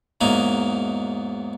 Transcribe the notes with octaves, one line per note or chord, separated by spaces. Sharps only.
E2 G#2 F#3 A#3 D#4